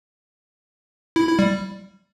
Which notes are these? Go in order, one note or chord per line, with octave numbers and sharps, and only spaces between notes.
E4
E4
G3